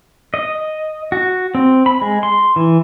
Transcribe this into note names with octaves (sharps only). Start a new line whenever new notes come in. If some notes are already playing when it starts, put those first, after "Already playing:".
D#5
F#4
C4
B5
G#3
C6
E3